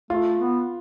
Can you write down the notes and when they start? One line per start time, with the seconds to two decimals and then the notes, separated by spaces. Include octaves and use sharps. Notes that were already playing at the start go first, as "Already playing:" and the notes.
0.10 A3 F4
0.39 B3